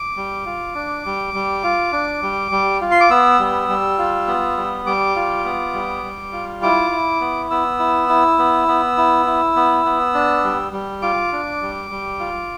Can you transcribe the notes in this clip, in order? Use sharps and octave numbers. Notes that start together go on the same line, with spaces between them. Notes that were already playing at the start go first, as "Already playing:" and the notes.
Already playing: D6
G3
F4
D4
G3
G3
F4
D4
G3
G3
F4
C6
D6
B3 E6
G3
G3
F4
B3
G3
G3 D6
F4
B3
G3
G3
F4
E4 D6
E4
B3
B3 E6
E4
E4
B3
B3
E4
E4
B3
B3
D4
G3
G3
F4 D6
D4
G3
G3
F4